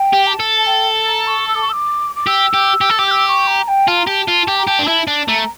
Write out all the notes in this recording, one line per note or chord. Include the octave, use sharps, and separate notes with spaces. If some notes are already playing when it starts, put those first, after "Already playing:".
Already playing: G5
G4
A#5
A5
A4
G5
A#5
C#6
E6
D6
C#6
E6
D6
D6
G4 E6
G4
G4
A4
G4
G6
E6
C#6
A#5
G5
F4 A5
A#5
G4 A5
F4
G4
A#5
G4 A5
D4
E4 A5
D4 A5
A3 A#5